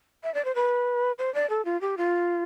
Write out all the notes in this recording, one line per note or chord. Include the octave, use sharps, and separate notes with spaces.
E5
D5
C5
B4
C5
D5
A4
F4
G4
F4